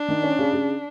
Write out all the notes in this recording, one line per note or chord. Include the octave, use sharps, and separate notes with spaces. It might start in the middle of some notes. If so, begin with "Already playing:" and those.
Already playing: D4
D#3
C#4
C#3
C#3